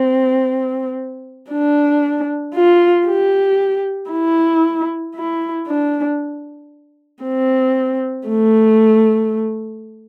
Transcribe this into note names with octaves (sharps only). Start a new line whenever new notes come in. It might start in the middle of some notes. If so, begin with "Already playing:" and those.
Already playing: C4
D4
F4
G4
E4
E4
D4
C4
A3